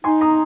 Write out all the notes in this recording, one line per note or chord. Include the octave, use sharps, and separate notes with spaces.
D#4 G#5 C6
A#5 D#6